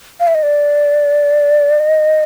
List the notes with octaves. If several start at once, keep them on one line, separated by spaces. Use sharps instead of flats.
F5
E5
D#5
D5
D#5